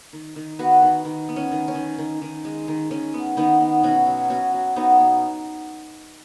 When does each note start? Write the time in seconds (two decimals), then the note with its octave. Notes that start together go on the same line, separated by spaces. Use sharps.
0.13 D#3
0.36 D#3
0.59 B3 F#4 B4
0.82 D#3
1.05 D#3
1.29 B3
1.36 C#4
1.52 D#3
1.68 C#4
1.75 D#3
1.98 D#3
2.22 D#3
2.45 G#3
2.68 D#3
2.91 D#3 C#4
3.14 B3
3.37 D#3 B3 D#4
3.61 B3
3.83 B2 C#4 F#4
4.07 F#3
4.30 B3 C#4 F#4
4.53 F#3
4.76 F#3 B3 D#4
5.00 B2